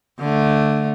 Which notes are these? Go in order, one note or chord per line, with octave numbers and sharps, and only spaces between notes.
D3 A3